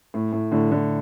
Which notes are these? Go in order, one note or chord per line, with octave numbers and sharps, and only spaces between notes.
A2
A2
A2 D3
A2 D3